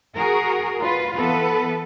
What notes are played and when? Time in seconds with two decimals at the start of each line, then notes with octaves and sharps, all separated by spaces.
0.15 F#4 G#4 A#4
0.81 F4 B4
1.17 E3 B3 A4 B4